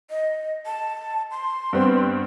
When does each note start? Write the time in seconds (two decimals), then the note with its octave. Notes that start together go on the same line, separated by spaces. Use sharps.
0.10 D#5
0.66 A5
1.31 C6
1.73 G2 B3 C4